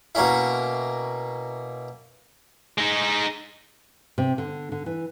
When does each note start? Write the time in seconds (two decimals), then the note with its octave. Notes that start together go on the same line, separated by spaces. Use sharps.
0.15 B2 A#3 C#4 E4
2.78 G#3 D#4
4.18 C3
4.38 D3
4.72 D3
4.86 E3